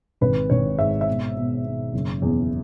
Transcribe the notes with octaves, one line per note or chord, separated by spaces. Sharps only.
G#1 B4
G#1 C#5
G#2 E5
E5
B2
B2
B2
F#1
E2